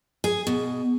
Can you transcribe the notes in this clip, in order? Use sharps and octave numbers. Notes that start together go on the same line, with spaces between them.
G#4
B2